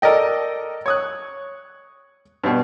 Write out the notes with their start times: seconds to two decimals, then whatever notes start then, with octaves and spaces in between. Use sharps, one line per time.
0.02 A4 A#4 D5 D#5 G5
0.86 C#5 D#6 F#6
2.44 G2 B2